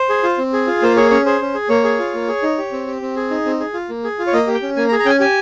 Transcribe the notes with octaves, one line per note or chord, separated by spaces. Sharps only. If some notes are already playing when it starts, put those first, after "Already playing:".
Already playing: C5
G#4
F4
C4
G#4
F4
A#3 C5
G#4 C#5
C#4 C#5
G#4 C5
C#4
G#4
A#3 C#5
G#4
F4
A#3
G#4
D#4
G4
C4
G4
C4
G#4
D#4
C4
G#4
F4
A#3
G#4
F4
C#5
A#3 D#5
G4
G5
C#4
A#3 G#5
A#5
G#4
A#5
C#4 G5 G#5
G4 G#5